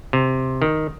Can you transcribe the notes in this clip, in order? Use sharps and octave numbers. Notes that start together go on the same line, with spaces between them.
C3
D#3